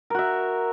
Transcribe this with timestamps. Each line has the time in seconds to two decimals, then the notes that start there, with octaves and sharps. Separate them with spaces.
0.10 A#4
0.14 F#4
0.19 E5